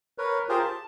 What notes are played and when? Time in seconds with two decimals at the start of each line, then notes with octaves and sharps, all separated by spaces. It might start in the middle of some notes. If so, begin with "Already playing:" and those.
0.18 A#4 B4 C#5
0.49 F4 G4 G#4 A#4 C5
0.61 A5